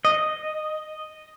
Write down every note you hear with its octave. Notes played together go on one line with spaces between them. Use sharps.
D#5